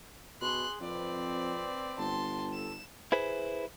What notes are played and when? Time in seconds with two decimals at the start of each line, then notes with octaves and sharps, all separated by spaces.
0.41 B2 G#4 C6 F#6
0.81 F2 C4 B4 D5
1.98 G1 A5 C6
2.53 A4 E7
3.12 E4 G#4 B4 C5